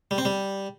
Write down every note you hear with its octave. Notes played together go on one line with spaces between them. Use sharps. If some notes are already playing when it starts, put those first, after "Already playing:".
G3
C4
G3